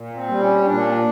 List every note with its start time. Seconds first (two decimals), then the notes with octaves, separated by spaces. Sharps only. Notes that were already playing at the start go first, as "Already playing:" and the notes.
Already playing: A#2
0.15 C4
0.28 G3
0.40 C#4
0.65 A#2 D4